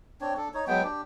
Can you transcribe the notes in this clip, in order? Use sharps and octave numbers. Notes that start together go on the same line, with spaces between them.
C4 D4 C#5
D4 A4
D#4 C#5
F#3 G#3 B3 G5
D4 G4